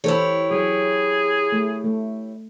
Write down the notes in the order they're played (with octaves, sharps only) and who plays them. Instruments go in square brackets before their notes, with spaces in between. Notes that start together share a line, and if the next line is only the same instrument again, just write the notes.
[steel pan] E3 A4 C5 [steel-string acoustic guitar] E4 G4 C#5
[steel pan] F#3 [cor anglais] G#4
[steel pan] A3
A3